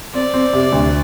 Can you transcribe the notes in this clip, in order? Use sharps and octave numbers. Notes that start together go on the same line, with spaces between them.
C4 D5
C4
C3
D2